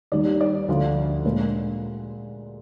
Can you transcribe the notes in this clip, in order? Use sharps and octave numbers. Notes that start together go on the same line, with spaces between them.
D#2 D#3 G3 D5
D5
D2 D3 F3
A#2 G#3 A#4